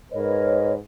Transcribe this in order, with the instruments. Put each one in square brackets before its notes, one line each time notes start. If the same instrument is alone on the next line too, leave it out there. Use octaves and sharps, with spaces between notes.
[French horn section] G#2 B4 [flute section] A#4 C#5 D#5